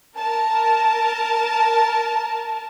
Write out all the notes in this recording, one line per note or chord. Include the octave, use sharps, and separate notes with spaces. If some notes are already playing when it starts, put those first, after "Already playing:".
A#4 A5